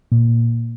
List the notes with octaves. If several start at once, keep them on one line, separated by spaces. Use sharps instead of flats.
A#2